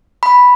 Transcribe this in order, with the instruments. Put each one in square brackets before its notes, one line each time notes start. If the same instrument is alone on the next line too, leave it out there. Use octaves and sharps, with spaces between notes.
[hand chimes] B5